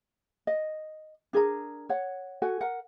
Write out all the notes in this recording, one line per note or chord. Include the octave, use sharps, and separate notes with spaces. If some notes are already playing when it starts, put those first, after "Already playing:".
D#5
D4 G#4 A#4 A#5
C#5 F#5
F#4 A4 F#5 G#5
A#4 F#5